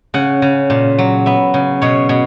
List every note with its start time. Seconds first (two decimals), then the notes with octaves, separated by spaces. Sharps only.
0.14 C#3 F#5
0.42 C#3
0.70 A#2
0.98 F#3
1.26 B3 E5
1.54 C#3
1.82 B2 C#5
2.09 B2